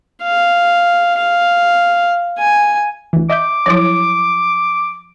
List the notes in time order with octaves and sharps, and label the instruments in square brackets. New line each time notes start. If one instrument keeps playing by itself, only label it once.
[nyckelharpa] F5
F5
G#5
[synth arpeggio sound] D2 E3
[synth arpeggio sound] D#5 E5 G6 [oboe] D6
[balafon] F3 F#3 E4